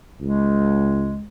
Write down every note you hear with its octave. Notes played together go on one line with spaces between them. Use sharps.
C#2 G#3